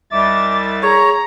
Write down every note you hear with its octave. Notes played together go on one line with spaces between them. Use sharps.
C2 G3 D#5 E5 D6 A6
G#4 C#5 A#5